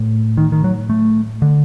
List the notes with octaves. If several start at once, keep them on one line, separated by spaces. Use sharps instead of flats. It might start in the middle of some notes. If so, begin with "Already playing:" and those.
Already playing: A2
D#3
D#3
F#3
A3
D3